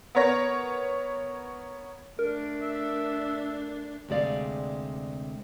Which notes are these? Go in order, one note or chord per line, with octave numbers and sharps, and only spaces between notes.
B3 A#4 C#5 A#6
A3 D4 A#4
E5
D2 C3 G#3 D5 F5